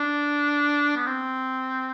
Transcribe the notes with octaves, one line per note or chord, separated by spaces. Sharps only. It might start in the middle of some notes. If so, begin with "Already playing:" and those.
Already playing: D4
B3
C4